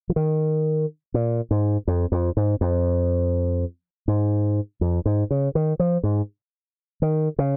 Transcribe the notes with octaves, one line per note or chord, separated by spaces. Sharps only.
F3
D#3
A#2
G#2
F2
F2
G#2
F2
G#2
F2
G#2
C#3
D#3
F3
G#2
D#3
C#3